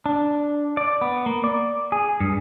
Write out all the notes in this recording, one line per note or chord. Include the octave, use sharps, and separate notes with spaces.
D4
D5
B3
A#3
D5
G#4
G2